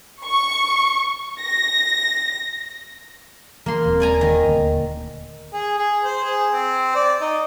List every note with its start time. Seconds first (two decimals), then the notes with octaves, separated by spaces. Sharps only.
0.25 C#6
1.40 A#6
3.66 E3 A#3 C6
3.85 D#1 C4
4.00 D5 G#5 A#5
4.21 D#3
4.45 D#1 D2 A#3
5.53 G#4
5.78 G#4
6.04 C5
6.24 G#4
6.51 C4
6.95 D5
7.21 D#4